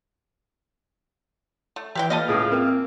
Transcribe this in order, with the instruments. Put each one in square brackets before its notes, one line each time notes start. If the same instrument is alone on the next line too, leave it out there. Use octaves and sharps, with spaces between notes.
[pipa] A3
[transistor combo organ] E3 [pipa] G4 B4 G5
[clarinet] A#3 [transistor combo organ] F4 [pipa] A4 B4 D#5
[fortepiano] C#2 A2 [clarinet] G#4
[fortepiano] A#3 [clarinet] C4